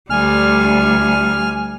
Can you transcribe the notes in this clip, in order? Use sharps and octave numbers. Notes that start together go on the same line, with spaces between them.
D2 G3 G#5 F6